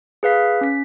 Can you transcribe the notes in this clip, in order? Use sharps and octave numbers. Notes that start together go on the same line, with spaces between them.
G#4 B4 F5 B6
C#4 B6